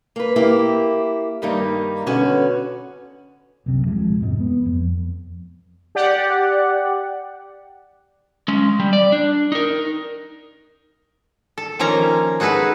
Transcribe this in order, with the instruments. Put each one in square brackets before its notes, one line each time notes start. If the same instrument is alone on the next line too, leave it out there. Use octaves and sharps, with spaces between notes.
[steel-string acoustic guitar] A#3 B4
A#3 E4 G4
G2 D#3 G3 A#3 D#4
B2 D3 C#4 F#4 B4
[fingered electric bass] C2 F#2 C3
D#1 F3 G#3
F2 G#2 C3
B3
F2
[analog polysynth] G4 D5 F#5
[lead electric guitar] G#3 C#4
G3
D5
D4
D#4 A#4
[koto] A4
D#3 F3 A#3 C#4 A#5
D#4 F#4 G#4 A4 B4